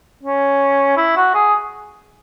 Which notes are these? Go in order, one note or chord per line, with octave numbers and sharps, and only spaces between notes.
C#4
E4
F#4
G#4